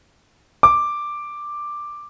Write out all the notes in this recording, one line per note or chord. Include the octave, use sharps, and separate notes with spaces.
D6